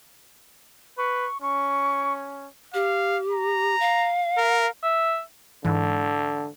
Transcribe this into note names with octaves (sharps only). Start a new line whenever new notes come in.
B4 C#6
C#4 C#6
G4 F5
A#5
F5
A#4
E5
G#2 D3 E3